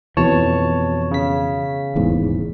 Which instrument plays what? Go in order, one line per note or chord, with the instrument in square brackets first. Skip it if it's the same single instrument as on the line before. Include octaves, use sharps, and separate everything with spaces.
[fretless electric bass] F2 B2 E3 [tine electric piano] C#5 A5
[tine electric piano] C#3 B6
[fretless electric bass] D#1 E2 G#2